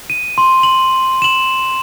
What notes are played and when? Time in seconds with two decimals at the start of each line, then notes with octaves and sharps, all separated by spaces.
0.10 D#7
0.38 C6 D#7
0.63 F#7
1.22 E7 F#7